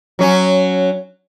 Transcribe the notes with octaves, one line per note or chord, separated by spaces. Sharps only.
F#3 C#4